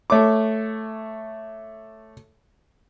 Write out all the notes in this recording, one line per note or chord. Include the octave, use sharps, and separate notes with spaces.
A3 C#5 D6